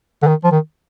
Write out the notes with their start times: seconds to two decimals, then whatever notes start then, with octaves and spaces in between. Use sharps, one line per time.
0.23 D3
0.27 D#3
0.44 F3
0.52 D#3